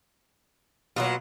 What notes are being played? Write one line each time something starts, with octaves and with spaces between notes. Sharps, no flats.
B2 F#3 A#3 F4 F#5